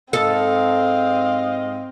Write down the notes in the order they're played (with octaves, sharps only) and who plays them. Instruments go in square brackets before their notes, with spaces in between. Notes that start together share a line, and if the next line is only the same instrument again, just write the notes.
[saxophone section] G#2 D#5 [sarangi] C4 [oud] A4 [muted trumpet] F5